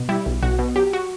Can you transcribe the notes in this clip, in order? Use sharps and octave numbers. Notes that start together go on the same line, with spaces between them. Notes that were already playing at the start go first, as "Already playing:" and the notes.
Already playing: B2
G3 E4
B1
B1 F#4
B2
F#3 G4
F#4